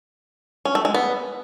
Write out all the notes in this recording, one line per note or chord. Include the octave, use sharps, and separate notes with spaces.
C#4
A3
G#3
B3